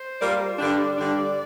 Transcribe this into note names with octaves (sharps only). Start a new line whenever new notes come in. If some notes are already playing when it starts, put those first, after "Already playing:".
Already playing: C5
G3 A#3 F4 A#4 D5
G2 D3 G3 D4 D5
G2 D3 G3 D4 D5